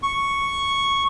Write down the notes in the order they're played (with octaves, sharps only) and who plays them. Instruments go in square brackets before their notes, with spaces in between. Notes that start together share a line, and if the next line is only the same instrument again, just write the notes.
[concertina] C#6